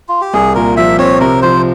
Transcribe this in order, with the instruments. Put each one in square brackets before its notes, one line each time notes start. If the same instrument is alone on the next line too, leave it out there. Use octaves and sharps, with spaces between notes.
[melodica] F4
G4
[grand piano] C2 [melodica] G#4
[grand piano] A#2 [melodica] A#4
[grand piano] F3 [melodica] E5
[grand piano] C4 [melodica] C#5
[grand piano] C3 [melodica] A#4
[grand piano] F3 [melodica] C5